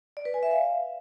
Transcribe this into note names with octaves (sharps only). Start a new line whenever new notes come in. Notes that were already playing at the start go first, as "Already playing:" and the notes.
D5
B4
G#5
E5
F5